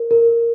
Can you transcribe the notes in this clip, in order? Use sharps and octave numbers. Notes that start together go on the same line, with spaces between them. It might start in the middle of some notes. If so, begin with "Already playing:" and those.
Already playing: A#4
A#4